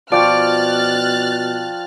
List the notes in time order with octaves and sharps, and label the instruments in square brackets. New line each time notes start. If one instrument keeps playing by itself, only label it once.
[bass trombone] B2 [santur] F3 G5 C#6 [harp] D5 [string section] F6 F#6 A6